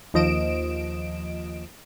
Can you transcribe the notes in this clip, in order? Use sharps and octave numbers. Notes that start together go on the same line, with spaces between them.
D#2 F3 D#5 D7 E7